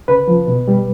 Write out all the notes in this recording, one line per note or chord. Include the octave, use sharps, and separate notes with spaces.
C#3 B4
F3
B2
G3